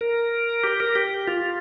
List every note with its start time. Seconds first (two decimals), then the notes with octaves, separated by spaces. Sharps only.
0.01 A#4
0.64 G4
0.80 A#4
0.95 G4
1.27 F4